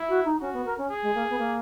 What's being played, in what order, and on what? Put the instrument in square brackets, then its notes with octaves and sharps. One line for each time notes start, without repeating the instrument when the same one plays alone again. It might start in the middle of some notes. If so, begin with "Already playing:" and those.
Already playing: [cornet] E4
[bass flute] F#4
D#4
[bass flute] C#4 [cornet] F#4
[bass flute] B3
A#4
C#4
[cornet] G#4
[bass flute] G#3
A#3
B3
A#3